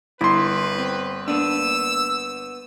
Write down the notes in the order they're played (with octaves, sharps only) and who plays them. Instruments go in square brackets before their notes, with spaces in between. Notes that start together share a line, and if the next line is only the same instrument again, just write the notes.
[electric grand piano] G1 C6 [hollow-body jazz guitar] E4 [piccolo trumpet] B4
[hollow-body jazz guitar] C4
[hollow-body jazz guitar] A#3 B3 D4 [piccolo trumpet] E6